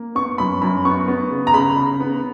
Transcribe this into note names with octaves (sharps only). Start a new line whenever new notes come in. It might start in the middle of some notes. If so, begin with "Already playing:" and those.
Already playing: A#3
B3 C#6
F#2 B5
F#2 B5
B3 C#6
B3
C#3
A#5
C#3 B5
C#3
B3